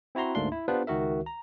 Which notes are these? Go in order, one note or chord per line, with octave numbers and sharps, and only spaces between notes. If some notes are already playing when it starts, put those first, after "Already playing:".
C4 E4 F#4 A#5 C6
D2 G#2 A3 A#3 D4 C6
E4
B3 D4 F4 G4 B4 C5
C#2 D#3 F#4 A#4 E5
A#5